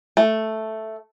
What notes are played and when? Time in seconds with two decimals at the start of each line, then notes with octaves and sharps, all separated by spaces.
0.17 A3